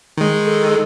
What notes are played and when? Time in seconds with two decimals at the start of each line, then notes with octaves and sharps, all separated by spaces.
0.18 D#3 G#3
0.45 A4